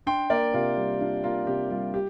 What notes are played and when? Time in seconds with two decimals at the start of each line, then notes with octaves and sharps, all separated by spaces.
0.06 D4 G5 C6
0.30 A#3 A#4 D5
0.54 C3 F4 A#4
0.77 G3
1.00 D4 F4
1.24 A#3 F4 A#4
1.47 C3 G4
1.71 G3 F4
1.94 G4